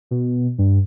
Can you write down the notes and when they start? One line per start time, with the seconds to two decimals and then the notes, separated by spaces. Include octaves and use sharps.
0.11 B2
0.58 G2